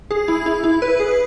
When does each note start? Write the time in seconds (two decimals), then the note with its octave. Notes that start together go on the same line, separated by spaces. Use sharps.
0.11 G#4
0.28 E4
0.46 E4
0.64 E4
0.82 B4
1.00 G#4